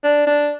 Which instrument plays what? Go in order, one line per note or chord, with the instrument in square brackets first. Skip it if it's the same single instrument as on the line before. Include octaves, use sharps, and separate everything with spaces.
[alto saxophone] D4
D4